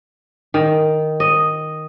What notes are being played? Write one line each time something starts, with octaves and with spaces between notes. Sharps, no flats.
D#3
D#5